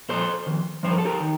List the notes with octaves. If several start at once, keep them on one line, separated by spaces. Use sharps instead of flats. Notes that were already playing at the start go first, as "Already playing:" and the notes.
A#2 F3 A4 C5
F2 D#3
G2 D3 F3 C5
A#4
A4
G4 A#4
D#3